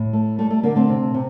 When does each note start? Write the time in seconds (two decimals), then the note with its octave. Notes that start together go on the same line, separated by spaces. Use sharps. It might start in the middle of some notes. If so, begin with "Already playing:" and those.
Already playing: A2
0.13 A3
0.38 G3 A3
0.51 A3
0.63 D3 A#3
0.75 A3 C4
0.89 C3
1.14 C3